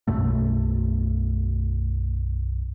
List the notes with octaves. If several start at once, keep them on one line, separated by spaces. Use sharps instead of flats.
B1 F#2 B2 A3